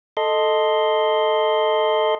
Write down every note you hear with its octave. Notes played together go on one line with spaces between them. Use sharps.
A4 D#5 C6